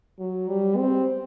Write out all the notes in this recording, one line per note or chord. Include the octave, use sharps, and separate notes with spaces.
F#3
G3
C4